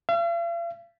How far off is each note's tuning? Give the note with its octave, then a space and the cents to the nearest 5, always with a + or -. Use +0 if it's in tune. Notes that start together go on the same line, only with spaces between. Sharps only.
F5 -45